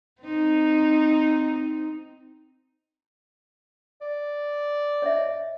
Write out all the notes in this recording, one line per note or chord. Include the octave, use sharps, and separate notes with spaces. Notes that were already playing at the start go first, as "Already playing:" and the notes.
C4 D#4
D5
C#5 D#5 E5